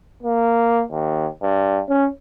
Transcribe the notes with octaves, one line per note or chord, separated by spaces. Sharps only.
A#3
D#2
G2
C#4